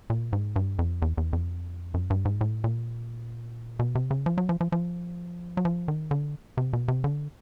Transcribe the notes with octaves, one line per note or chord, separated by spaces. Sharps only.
A#2
G#2
G2
F2
E2
E2
F2
F#2
G2
G#2
A2
A#2
B2
C3
C#3
F3
F#3
F3
F3
F3
F#3
F3
D#3
D3
C3
B2
C3
D3